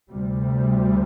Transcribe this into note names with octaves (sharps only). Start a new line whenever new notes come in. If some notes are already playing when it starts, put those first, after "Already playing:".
D2 C3 G3